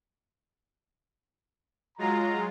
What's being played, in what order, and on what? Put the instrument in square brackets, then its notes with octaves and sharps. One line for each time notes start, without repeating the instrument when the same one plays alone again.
[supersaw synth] F#3 G#3 F4 [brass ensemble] A#5